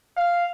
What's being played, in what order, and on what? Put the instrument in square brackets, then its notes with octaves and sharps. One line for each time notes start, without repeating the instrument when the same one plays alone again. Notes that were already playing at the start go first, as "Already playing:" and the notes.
[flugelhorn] F5